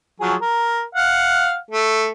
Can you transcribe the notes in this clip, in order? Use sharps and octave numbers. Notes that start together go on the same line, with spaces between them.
F3 F#3 G#4
A#4
F5 F#5
A3